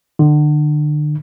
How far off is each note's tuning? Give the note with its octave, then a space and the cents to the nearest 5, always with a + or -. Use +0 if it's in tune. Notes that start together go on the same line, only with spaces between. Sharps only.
D3 +35